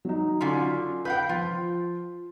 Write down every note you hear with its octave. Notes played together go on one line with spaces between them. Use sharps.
F#3 D#4
D3 C#4 F4
B4 F5 G5 G6
F3 F4